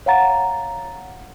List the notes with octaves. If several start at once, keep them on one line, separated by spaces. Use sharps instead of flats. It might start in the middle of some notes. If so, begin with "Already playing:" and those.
C#5 F5 F#5 A#5 A6